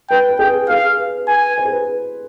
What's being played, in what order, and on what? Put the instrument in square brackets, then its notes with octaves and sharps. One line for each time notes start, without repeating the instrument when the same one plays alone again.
[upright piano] B4 [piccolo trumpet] G5
[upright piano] B4
[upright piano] G#4 [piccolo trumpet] G5
[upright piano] G#4 [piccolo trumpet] F5
[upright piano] B4
[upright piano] B4 [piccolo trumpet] G#5
[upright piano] C5
G#4
B4